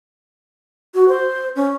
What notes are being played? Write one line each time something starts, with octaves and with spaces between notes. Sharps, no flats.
F#4
C5
C#4